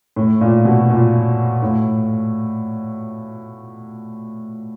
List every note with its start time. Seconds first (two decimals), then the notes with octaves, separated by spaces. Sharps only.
0.16 A2
0.41 A#2
0.65 B2
0.90 A#2
1.62 A2